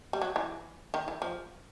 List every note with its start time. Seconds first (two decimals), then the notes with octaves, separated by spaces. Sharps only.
0.13 G3
0.22 F#3
0.36 E3
0.94 D#3
1.08 E3
1.22 F3